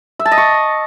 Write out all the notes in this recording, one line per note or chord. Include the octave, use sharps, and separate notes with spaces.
E5
A5
D#5
C#6